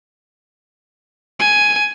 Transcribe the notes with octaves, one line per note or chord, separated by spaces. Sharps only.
G#5